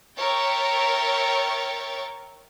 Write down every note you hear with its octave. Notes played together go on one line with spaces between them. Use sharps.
A#4 C#5 E5 G5 C#6 A6